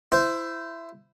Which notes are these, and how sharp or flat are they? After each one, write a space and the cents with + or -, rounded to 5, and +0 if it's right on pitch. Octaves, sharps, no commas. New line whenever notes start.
E4 +15 C5 -15